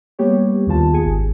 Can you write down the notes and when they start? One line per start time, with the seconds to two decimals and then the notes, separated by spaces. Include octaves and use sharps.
0.19 G3 A#3 B3 G4 C#5
0.67 D#2 D#3 B3 F4 G4 A5
0.93 D#2 G#4 G#5 C#7
1.04 G#1